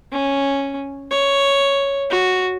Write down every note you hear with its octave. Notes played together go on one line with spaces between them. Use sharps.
C#4
C#5
F#4